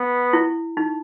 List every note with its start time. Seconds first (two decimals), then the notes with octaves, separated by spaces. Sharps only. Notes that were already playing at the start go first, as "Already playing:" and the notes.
Already playing: B3
0.33 E4
0.77 D#4